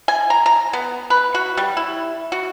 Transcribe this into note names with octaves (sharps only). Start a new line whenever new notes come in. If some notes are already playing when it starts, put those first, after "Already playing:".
G#5
A#5
A#5
B3
B4
F#4
G3
E4
F#4